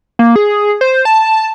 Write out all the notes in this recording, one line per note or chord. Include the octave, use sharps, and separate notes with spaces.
A#3
G#4
C5
A5